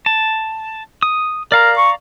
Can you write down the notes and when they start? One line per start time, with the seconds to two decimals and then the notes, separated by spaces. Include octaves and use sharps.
0.06 A5
1.03 D#6
1.52 A#4 D5 F5 A#5
1.77 C#6